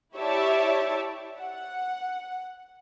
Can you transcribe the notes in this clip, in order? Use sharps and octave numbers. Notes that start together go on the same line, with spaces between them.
E4 G4 C#5 D5 E5 A5
F#5